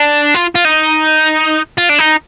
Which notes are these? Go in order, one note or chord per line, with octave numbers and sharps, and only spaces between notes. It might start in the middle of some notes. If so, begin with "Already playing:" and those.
Already playing: D4
F4
F4
D#4
F4
D4
D#4